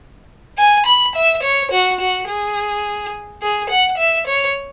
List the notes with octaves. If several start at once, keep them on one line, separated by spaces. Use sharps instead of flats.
G#5
B5
E5
C#5
F#4
F#4
G#4
G#4
F#5
E5
C#5